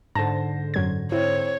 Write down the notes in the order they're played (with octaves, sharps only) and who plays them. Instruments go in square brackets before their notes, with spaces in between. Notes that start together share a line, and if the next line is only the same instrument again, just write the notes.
[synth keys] G#2 D3 [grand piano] C5 A#6 [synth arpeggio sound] A5
[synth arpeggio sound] F#2 F#3 G#6
[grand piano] C4 [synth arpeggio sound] E4 [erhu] C#5